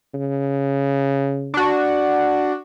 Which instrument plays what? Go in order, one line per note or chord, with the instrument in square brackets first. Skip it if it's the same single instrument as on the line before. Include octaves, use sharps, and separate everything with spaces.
[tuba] C#3
[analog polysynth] D4 F#4